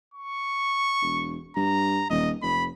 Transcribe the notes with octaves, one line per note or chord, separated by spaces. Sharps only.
C#6
E1
G2 A#5
D#1 D#5
F1 B5